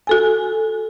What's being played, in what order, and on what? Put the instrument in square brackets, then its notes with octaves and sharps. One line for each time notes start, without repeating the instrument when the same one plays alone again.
[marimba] F#4 A4 G#5